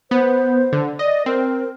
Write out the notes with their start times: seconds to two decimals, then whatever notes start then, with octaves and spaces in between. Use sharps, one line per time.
0.11 B3 C5
0.73 D3
0.99 D5 D#5
1.26 C4 A#4